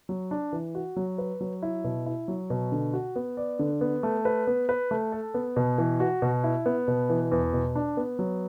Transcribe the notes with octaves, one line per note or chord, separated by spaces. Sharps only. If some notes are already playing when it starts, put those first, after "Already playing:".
F#3
D4
E3
F#4
F#3
B4
F#3
E4
B2
E4
F#3
B2
D3
F#4
B3
D5
D3
B3
A3
B4
B3
B4
A3
A4
B3
B2
E3
F#4
B2
E4
B3
B2
E3
E2
B2
D4
B3
F#3